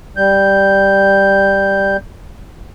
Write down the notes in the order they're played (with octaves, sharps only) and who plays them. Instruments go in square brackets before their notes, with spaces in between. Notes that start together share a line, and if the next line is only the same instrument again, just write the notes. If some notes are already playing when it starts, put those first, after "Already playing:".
[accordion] G3 G6